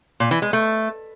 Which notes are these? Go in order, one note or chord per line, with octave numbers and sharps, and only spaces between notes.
A#2
E3
G#3
A3